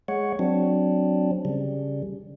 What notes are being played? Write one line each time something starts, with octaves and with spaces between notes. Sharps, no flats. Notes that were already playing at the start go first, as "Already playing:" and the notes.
G#3 C#5 F#5
F#3 C4 D4
C#3 G3